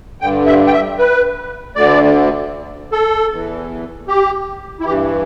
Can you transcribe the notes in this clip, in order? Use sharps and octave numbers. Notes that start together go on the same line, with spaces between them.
G2 D3 G5
E5
G5
E5
B4
D2 D3 D5
A4
E2 E3
G4
E4
G2 E3 G4